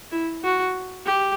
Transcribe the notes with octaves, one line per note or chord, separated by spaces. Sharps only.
E4
F#4
G4